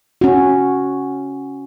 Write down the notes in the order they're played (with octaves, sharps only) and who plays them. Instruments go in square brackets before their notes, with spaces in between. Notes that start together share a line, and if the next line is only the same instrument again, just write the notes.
[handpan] C#4 F#4